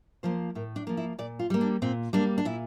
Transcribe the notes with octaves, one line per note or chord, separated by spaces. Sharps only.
F3 A#3 C5
A2 A#4
D4
F3 A#3
E4
A#2 D5
F4
G3 A#3
D4
A#2 C4
G3 A#3 D4
D4
A#2 E4